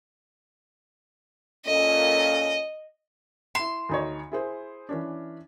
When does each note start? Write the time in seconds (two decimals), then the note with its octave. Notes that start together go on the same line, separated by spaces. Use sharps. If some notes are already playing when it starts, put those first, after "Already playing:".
1.66 A#2 C#4 A4 D#5
3.55 E4 C6 E7
3.89 D2 D#4 C#5
4.32 E4 G#4 C5
4.89 E3 C#4 D4